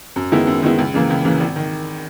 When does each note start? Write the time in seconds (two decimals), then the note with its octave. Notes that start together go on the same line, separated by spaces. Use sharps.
0.16 F#2
0.32 D#3 G#3 B3 E4
0.47 F#2
0.63 D#3 G#3 B3 E4
0.78 C#2
0.94 C#3 E3 A#3
1.10 C#2
1.25 C#3 E3 A#3
1.40 G#1
1.56 D#3